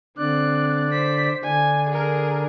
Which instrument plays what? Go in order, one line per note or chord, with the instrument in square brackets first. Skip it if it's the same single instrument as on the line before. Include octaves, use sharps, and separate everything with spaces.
[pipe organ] D3 D5 [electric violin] C4 F#6
[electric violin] C5 B6
[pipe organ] D3 D4 [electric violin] G#5
[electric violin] G#4 A#4